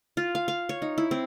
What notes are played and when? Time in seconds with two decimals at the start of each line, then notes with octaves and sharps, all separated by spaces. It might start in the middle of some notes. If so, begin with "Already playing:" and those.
0.17 F4
0.35 F5
0.48 F5
0.69 C#5
0.82 D#4
0.98 E4
1.11 C4